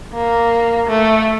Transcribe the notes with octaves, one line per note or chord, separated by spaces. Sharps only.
A#3
A3